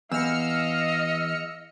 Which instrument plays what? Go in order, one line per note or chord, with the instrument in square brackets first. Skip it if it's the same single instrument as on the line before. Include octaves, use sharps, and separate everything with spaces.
[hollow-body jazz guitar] E2 [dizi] D#5 [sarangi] F5 [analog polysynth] E6 F6 C#7